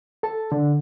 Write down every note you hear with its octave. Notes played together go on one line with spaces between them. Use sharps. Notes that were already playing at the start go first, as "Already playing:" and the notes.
A4 A5
D3